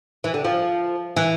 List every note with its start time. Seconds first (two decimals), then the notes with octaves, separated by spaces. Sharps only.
0.24 E3
0.34 D3
0.45 F3
1.17 E3